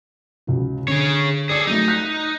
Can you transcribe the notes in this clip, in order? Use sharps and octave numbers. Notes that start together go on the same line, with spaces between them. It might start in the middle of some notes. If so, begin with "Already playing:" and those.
C#2 F#4
D3 G#4 C#5
G#4 A4 D5 D6
F#3 A3 D#4
F#6 G6 B6